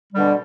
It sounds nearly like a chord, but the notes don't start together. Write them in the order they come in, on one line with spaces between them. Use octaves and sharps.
G3 D3 B2